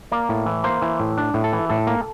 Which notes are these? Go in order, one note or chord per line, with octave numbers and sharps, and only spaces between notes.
A#3 D5
A2
E3
A#3 C5
E3
A2
D4
A2
A4
E3
A2 A4
A#3